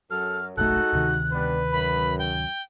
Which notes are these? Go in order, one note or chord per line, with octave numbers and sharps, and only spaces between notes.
F#2 F#3 A4 F6
F#1 B1 G#3 A3 D#4 F#4 A4 F#6
D2 C3 D#3
G3 B3 D4 B4
F#2 B5
G5